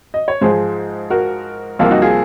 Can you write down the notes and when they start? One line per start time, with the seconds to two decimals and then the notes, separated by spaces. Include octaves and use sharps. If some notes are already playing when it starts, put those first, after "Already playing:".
0.14 D#5
0.28 C#5
0.41 G#2 F3 G#3 G#4 C5
1.10 F#4 A#4
1.79 C2 C3 F3 A#3 F4
1.90 D#4 F#4
2.02 F4 G#4